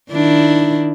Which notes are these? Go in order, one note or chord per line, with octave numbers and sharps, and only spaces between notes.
D#3 D4 E4